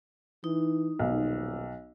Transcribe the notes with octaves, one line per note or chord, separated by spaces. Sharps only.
E3 D#4
D#1 B1